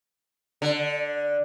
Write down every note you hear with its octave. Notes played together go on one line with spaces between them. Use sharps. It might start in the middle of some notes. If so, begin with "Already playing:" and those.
D3